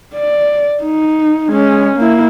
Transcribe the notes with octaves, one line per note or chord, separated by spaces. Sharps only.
D5
D#4
G#3 C#4
A#3 E4